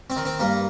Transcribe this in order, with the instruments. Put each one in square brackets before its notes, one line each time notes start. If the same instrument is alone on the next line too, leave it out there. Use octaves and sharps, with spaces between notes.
[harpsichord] C4
D#3
C4
G2 A#3